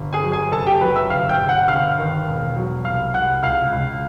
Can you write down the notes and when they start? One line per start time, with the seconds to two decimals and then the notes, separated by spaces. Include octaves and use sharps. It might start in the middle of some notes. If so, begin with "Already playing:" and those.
Already playing: G1
0.13 G#4 G#5
0.23 F#3
0.32 G#4 G#5
0.52 F#1 A4 A5
0.67 G4 G5
0.81 F#3 B4 B5
0.96 E5 E6
1.10 G1 F5 F6
1.29 G5 G6
1.39 G1
1.49 F#5 F#6
1.68 G1 F5 F6
1.98 D#3
2.27 E1
2.56 F#3
2.85 C2 F5 F6
3.14 C2 F#5 F#6
3.43 C#2 F5 F6
3.72 C#2